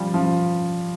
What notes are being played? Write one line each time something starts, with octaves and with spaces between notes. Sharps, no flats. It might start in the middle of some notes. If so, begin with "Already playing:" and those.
Already playing: F3 G3
F3